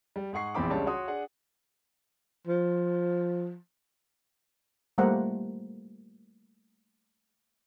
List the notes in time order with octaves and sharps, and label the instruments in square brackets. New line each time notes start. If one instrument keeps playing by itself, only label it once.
[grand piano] G3
G#2 G#4 F#5 C#6 C7
A#1 E2 E3 C4 B5 D6
C#2 C#3 G3 D4 C#5 A5
F#4 C#5 C6 D#6
D4 G#4 F#5
[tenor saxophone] F3
[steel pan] G3 A3 A#3 C5 F#5 A#5